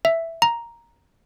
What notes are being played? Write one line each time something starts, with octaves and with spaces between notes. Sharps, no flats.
E5
A#5